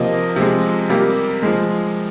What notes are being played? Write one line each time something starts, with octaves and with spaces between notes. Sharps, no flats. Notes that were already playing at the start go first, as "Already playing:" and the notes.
Already playing: C3 F3 A#3 D#5
C3 F3 G#3
C3 G3 A#3
F3 G#3